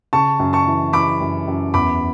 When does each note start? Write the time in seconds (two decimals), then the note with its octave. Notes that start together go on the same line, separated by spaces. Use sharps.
0.13 C#3 A5 C#6
0.39 F#2
0.53 A5 C#6
0.67 E3
0.93 E3 B5 D6
1.21 F#2
1.48 F#2
1.74 E2 B5 D6